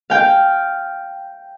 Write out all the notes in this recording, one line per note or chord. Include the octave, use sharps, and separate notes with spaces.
F5 G5